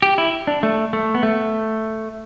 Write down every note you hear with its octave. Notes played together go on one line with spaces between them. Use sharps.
G4
E4
D4
A3
A3
B3
A3